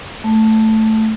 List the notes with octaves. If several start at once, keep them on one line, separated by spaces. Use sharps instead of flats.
A3